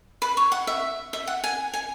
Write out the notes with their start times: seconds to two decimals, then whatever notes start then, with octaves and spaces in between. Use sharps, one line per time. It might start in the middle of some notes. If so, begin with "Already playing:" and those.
0.22 B4
0.37 C#5
0.52 F#5
0.67 E5
1.13 E5
1.27 F#5
1.44 G#5
1.73 G#5